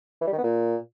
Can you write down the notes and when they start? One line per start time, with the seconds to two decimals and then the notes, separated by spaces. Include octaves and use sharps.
0.22 E3
0.27 G3
0.33 D#3
0.38 B3
0.44 A#2